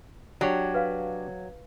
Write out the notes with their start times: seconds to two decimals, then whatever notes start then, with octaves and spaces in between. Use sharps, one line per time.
0.41 F#3 D4 G4 C#5
0.74 B4 F5